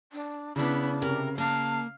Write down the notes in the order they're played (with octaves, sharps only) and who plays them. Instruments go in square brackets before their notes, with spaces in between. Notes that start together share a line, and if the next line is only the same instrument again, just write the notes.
[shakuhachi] D4
[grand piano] C#3 [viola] B3 E4 [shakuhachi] D4
[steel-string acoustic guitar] C3 [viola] A#4
[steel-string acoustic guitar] A#3 [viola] F5 [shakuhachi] A5